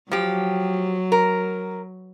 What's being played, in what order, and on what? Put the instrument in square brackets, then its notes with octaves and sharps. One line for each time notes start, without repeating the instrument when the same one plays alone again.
[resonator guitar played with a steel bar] F3 G4 [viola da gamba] F#3
[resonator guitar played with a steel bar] A#4